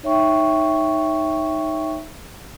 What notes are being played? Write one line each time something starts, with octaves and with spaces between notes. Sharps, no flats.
D#4 C#5 E5 G5 C#6